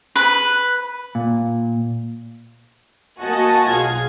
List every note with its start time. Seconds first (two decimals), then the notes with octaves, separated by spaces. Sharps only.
0.16 B4
1.15 A#2
3.21 A#3 F#4 D#5 F#5 G#5 A5
3.69 B1 F4 G#4 G#6